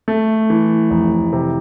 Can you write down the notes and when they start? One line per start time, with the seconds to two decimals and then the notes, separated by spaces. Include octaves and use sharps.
0.08 A3
0.50 E3
0.91 F1
1.33 C3